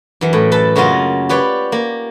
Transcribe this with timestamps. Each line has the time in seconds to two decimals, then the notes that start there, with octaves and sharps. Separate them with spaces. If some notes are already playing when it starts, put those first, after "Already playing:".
0.21 F#2 E3
0.33 A2
0.52 A4 B4 A5
0.76 F#2 C#3 A#3 F4 F#4 D#5
1.29 G4 B4 C#5 D5
1.72 A#3